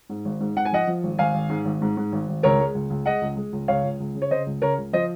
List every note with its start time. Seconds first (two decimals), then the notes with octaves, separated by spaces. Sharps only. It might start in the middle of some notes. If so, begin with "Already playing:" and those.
0.09 G#2
0.25 G#1
0.40 G#2
0.56 G#2 F#5
0.65 G#5
0.72 F3 D#5 F#5
0.87 F3
1.03 G#1
1.19 G#1 F5 G#5
1.34 G#1
1.50 G#2
1.65 G#1
1.82 G#2
1.97 G#2
2.12 G#1
2.28 G#1
2.43 C#2 A#4 C#5
2.59 G#3
2.75 C#2
2.90 C#2
3.06 G#3 D#5 F#5
3.22 C#2
3.37 G#3
3.53 C#2
3.68 C#2 C#5 F5
3.83 C#2
4.00 C#2
4.15 C#3
4.22 C#5
4.31 C#3 C5 D#5
4.46 C#2
4.62 C#3 A#4 C#5
4.78 C#2
4.93 F3 C5 D#5